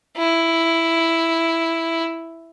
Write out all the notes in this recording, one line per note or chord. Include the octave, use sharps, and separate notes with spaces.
E4